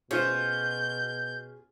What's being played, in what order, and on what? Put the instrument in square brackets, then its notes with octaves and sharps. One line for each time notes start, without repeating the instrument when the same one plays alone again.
[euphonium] B2 [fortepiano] C#4 F4 C5 [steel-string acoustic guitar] G#4 [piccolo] G6